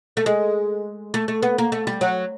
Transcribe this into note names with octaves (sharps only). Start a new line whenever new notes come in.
A3
G#3
A3
A3
B3
A#3
A3
G3
F#3